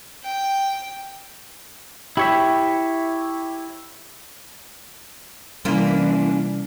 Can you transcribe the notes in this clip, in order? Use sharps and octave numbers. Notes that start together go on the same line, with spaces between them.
G5
E4 G4 C#5 E5
C3 E3 G3 A#3 C#4 D4 E4 F4